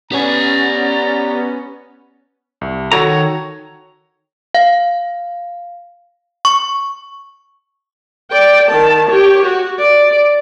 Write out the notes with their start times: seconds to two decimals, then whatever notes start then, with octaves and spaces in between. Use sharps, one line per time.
0.12 B3 C#4 G4 D5 G#5 A#5
2.61 C2
2.92 D#3 F#4 A4 C#5 A#5
4.55 F5
6.45 C#6
8.31 D5 G5
8.68 D#3 A5
9.09 G4 C#5
9.45 F#4
9.79 D5